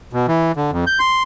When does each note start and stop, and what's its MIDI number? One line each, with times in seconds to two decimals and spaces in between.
0.13 0.26 47
0.28 0.52 52
0.57 0.71 50
0.71 0.85 41
0.87 0.99 91
0.99 1.23 84